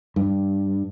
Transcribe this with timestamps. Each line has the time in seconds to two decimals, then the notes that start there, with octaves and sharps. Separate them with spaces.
0.16 G2